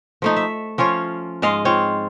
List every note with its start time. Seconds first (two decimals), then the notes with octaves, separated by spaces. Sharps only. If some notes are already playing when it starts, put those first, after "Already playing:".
0.22 F3 A3 D#4
0.37 E5
0.78 F3 C#4 F4 C#5
1.42 G#2 G#3 D#5 F5
1.65 C4 F4 C#5